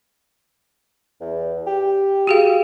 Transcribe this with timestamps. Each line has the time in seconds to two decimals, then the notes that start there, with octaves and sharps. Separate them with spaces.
1.21 E2
1.67 G4
2.27 F#4 G#4 F5